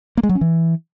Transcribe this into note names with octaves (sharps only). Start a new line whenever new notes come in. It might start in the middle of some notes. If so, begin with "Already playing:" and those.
A#3
G#3
F#3
C#4
E3